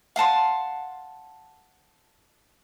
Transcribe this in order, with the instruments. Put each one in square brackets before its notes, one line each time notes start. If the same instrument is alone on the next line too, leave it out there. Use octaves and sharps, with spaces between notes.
[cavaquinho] F5 F#5 A5 C6